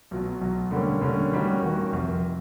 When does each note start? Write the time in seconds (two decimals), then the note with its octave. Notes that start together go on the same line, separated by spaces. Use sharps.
0.11 B1 B2 F#3
0.41 B1 B2 F#3
0.71 D3 G3 A#3 C#4
1.01 D3 G3 A#3 C#4
1.32 D#3 G3 A#3 C#4 F#4
1.62 D#3 G3 A#3 C#4 F#4
1.92 F1 F2 C3